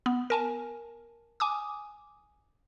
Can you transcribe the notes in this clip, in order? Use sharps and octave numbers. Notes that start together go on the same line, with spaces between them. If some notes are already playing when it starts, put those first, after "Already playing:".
B3
A#4 G#5 A5
G#5 D6 D#6